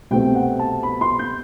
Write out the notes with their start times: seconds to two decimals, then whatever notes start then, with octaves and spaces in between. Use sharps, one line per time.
0.11 C2 B2 A3 C4 G5
0.35 F#5
0.59 A5
0.83 B5
1.01 C6
1.19 G6